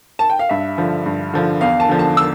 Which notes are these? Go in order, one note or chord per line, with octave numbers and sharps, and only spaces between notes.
A5
G5
F5
G2 E5
D3 F3
G2
D3 F3
E2 F5
A5
D3 F3
A5
E6